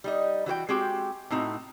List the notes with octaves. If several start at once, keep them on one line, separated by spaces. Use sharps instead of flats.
G3 D#4 D#5
E3 F#4 C5 G5
G#3 C4 F#4 G4 G5
A2 C4 D#4 F#4